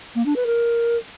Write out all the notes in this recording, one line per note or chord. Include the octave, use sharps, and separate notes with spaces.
A#3
D4
B4
A#4